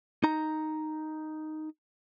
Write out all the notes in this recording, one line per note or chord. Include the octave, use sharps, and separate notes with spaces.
D#4 A#5